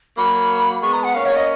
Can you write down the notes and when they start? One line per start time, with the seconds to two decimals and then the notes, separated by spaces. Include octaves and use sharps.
0.17 F#3 A#3 B5
0.82 G#3 B3 C#6
0.93 A#5
1.04 F#5
1.14 A#3 C#4 F5
1.25 C#5
1.36 D#5